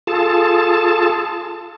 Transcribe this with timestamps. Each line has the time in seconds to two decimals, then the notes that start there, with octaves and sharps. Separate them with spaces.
0.07 F4 G#4 A4 A5